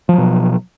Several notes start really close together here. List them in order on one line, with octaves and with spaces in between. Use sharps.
F3 F#3 B2